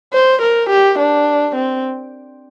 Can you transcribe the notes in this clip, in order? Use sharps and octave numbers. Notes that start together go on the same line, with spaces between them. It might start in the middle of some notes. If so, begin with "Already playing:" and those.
C5
A#4
G4
D4
C4